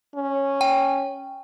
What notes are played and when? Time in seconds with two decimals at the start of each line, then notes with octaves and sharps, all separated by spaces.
0.15 C#4
0.61 G5